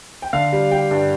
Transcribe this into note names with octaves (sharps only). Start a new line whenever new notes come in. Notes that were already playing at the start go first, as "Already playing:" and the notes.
G5
D3 F5
G3
G3 G5
G2